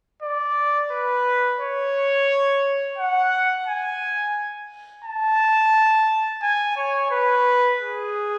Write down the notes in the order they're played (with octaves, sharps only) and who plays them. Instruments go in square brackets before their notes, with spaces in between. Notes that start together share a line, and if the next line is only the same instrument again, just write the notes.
[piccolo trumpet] D5
B4
C#5
F#5
G#5
A5
G#5
C#5
B4
G#4